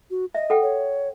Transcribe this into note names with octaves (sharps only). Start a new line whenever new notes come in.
F#4
D#5 E5
A4 F#5 G5
C#5